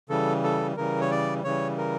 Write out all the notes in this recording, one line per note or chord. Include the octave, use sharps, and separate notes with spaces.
C#3 E3 G3 A4
A4
C#3 E3 G3 A#4
C#5
D5
C#3 E3 G3 C#5
A#4